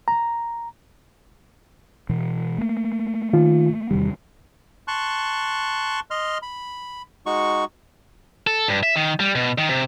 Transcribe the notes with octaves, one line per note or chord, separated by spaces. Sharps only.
A#5
B2 E3
A3 A#3
D#3 F4
E2 C3 D#3 G3
A5 C6 C#6 F#6
D#5 C6 F6
B5
G#3 D#4 F#4 C#6
A4
G2
E5
D#3
G3
B2
D#3
C3